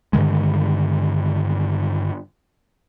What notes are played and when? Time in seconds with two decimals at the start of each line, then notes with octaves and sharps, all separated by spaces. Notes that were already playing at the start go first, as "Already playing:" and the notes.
0.13 G2 D3 D#3 G#3